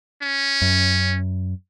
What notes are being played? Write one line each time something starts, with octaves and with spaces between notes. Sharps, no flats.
C#4
F#2